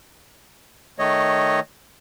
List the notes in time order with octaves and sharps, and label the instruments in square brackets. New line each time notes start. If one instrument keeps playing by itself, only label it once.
[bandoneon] D#3 A3 C#5 D#5